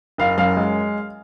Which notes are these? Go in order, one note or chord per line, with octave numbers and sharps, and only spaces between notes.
F#1 F5
F#2 F5
G#3